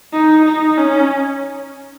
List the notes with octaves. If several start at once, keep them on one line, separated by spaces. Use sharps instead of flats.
D#4
D#4
C#4